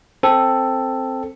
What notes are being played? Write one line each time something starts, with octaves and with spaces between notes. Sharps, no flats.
C4 A4